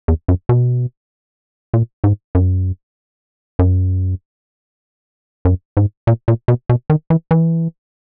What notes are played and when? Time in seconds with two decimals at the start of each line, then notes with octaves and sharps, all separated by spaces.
0.08 E2
0.28 F#2
0.49 B2
1.74 A#2
2.04 G#2
2.35 F#2
3.59 F#2
5.45 F#2
5.77 G#2
6.07 A#2
6.28 A#2
6.48 B2
6.69 B2
6.90 D#3
7.10 E3
7.31 E3